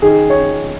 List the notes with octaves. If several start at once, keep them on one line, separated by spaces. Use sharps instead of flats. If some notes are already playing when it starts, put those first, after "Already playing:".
D#3 G#4
C#5